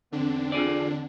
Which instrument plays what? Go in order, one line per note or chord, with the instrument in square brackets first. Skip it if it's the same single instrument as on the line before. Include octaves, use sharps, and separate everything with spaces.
[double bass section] E2 E3 C4 [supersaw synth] D3 D4
[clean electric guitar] F4 G#4 D5